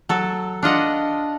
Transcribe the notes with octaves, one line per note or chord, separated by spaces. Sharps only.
F#3 A4
D4 F4 D#5 F#5